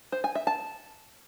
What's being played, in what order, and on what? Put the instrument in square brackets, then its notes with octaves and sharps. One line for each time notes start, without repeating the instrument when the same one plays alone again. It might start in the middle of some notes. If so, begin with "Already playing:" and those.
[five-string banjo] C5
G#5
E5
A5